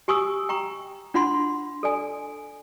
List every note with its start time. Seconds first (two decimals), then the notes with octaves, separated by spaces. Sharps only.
0.08 G4 G#5 C#6 D#6 E6
0.49 G5 A#5 C#6
1.14 D4 F4 F#5 B5 C6
1.83 A4 D5 G#5